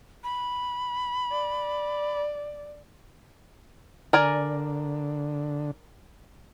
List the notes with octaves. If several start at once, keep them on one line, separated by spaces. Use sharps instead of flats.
B5
D5
D3 A#4 D5 G#5